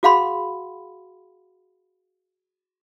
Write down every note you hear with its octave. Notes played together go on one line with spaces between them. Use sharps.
F#4 G#4 F5 F#5 B5 C6